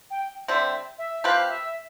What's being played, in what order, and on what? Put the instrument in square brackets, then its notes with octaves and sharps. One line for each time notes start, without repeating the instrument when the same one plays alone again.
[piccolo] G5
[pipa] D3 G3 C4 [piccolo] E5
[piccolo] E5
[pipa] F3 C4 G4 B4 [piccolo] F5
[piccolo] E5